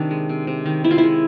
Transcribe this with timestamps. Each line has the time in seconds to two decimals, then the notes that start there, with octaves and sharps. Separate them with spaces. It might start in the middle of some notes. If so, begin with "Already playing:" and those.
Already playing: C3 D#3 D4
0.11 G#3
0.29 C3
0.47 C3
0.66 D#3
0.84 D#3 E4
0.91 F4
0.98 E4
1.03 G#3